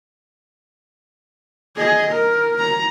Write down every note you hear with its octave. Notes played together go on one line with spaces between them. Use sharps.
G#4 D#5
A#4
A#5